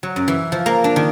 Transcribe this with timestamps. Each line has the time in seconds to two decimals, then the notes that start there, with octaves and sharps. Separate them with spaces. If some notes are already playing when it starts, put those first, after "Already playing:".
0.03 F#3
0.16 F#2
0.28 E3
0.52 F3
0.66 A#3
0.84 D4
0.96 D#3